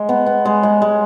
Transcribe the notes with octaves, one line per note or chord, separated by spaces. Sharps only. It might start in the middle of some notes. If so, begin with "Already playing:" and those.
Already playing: G#3
B3
B3
G#3
G#3
G#3